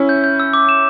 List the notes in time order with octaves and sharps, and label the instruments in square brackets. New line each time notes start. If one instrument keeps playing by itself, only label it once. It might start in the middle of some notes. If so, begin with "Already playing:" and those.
Already playing: [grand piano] C#4 E4
[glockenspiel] G6
G6
E6
D6
E7